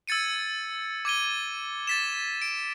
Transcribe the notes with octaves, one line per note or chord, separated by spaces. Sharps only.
E6 G#6 A6 C#7 D#7
D6 G#6 D#7 G7
A6 B6 E7
D7